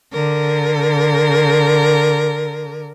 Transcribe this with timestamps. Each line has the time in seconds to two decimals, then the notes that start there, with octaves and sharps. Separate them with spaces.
0.11 D3 A#4